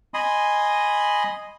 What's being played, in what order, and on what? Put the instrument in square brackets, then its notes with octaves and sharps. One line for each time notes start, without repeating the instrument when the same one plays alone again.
[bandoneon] D#5 G#5 B5 C6 D#6